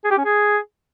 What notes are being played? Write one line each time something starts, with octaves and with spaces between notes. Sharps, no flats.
G#4
G4
C#4
G#4